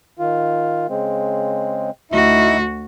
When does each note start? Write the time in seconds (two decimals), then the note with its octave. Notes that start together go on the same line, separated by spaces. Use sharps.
0.19 D#3 F4
0.89 C#3 G#3 C4
2.12 D2 D#4 E4 F#4 E5